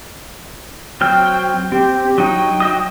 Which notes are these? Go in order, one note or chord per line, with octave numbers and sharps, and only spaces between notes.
F#3 C4 G5 F6
C4 G4
F#3 D#4 G5
F#3 D#5 D#6